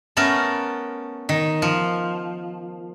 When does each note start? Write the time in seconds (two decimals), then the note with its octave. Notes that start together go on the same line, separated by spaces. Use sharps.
0.17 A3 B3 C#4 A4 A#4
1.29 D#3
1.62 F3